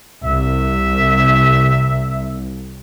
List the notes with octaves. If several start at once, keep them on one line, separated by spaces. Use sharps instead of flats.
C2 E5